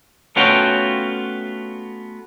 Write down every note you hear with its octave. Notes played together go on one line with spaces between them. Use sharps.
A3 B3 C#4 F4 F#4 G5